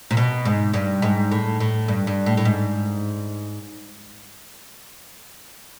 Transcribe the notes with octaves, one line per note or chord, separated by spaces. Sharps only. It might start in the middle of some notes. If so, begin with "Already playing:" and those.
A#2
B2
G#2
G2
G#2
A2
A2
G2
G2
A2
A2
G#2